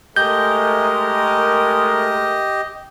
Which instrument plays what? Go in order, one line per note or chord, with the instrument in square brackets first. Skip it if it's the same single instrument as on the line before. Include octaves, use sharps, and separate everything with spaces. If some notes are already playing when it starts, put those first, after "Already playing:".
[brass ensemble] G#3 A3 A#4 [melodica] G4 D#5 [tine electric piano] G6